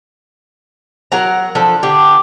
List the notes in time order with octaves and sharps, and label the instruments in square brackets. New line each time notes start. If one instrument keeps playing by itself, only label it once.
[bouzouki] F#3 A#4 F#5 A#5
F3 D4 A4
D3 D4 G4